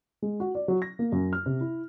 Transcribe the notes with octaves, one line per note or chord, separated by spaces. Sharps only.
G#3
F#4
D5
F#3
A#6
A#3
F#2
F6
C3
E4